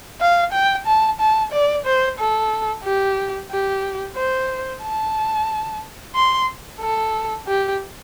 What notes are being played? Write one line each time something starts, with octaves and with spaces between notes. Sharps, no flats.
F5
G5
A5
A5
D5
C5
A4
G4
G4
C5
A5
C6
A4
G4